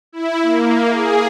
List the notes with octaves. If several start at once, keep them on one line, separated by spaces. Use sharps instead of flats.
E4
A#3
G#4